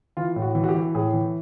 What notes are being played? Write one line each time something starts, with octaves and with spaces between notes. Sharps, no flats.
E3 F4
A2
F#4
E3
F#4
G4
E3
A2 G#4
E3